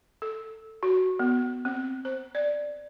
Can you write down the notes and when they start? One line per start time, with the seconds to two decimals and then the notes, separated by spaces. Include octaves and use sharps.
0.22 A4
0.83 F#4
1.19 B3
1.65 C4
2.05 C5
2.35 D5